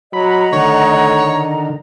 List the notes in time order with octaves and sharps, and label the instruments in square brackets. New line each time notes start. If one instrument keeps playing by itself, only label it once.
[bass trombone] F#3 [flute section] D#5 F#5 A#5 [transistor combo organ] B5
[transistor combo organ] D3 D#3 [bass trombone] A3 [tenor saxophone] C#5